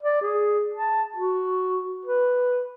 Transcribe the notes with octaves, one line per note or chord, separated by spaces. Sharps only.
D5
G#4
A5
F#4
B4